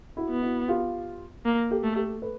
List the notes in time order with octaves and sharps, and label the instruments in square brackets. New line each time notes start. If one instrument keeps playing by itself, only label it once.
[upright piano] E4 F#4
[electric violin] B3
[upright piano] E4 F#4
F4 G4
[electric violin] A#3
[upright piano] G4 A4
[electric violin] A3
[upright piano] G4 A4
A4 B4